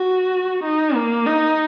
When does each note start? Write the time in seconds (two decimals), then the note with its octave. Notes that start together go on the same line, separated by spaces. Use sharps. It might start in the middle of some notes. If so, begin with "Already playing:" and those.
Already playing: F#4
0.64 D#4
0.95 A#3
1.26 D#4